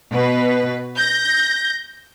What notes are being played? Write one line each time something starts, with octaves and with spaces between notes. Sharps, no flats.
B2 B4
G6 A#6